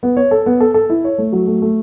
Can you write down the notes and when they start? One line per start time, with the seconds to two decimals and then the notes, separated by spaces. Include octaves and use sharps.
0.03 B3
0.17 C#5
0.31 A4
0.46 B3
0.60 A4
0.74 A4
0.90 E4
1.05 C#5
1.18 A3
1.32 F#3
1.47 A3
1.62 A3